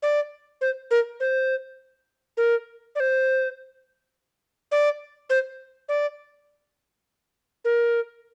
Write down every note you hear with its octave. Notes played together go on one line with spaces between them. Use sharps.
D5
C5
A#4
C5
A#4
D5
C5
D5
C5
D5
A#4